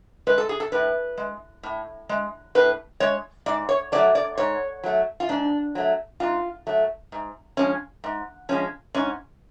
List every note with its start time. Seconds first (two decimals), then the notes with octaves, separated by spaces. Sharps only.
0.27 G#3 B4
0.38 A4
0.49 G#4
0.60 A4
0.72 A2 B4
1.18 G#3
1.63 A2
2.09 G#3
2.55 A2 B4
3.00 G#3 C#5
3.46 G#2 D5
3.69 C#5
3.92 A3 D5
3.96 F#3
4.15 D5
4.37 G#2 C#5
4.84 F#3 A3
5.20 F4
5.29 G#2 D4
5.75 F#3 A3
6.20 G#2 F4
6.67 F#3 A3
7.12 G#2
7.57 F3 G#3 C#4
8.04 G#2
8.49 F3 G#3 C#4
8.95 G#2 C#4